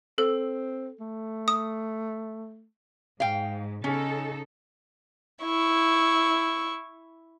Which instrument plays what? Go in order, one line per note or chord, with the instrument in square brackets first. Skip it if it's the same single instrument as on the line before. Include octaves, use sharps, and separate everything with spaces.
[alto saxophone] C4 [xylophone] A4
[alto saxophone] A3
[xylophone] D#6
[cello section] G#2 [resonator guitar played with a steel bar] F5 G5
[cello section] C#3 D#4 A4 [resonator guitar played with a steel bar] C#4
[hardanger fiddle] E4 C#6